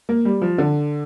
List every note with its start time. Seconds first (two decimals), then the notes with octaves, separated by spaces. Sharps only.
0.09 A#3
0.25 G3
0.42 F3
0.58 D3